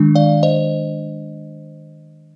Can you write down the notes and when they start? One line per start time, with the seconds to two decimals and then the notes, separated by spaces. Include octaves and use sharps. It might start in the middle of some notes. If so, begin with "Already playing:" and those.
Already playing: D#3 G#3 D4
0.15 D5 F5
0.43 C5 D#5